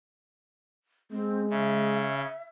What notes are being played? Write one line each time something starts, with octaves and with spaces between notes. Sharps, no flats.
G#3 C4
C#3 E5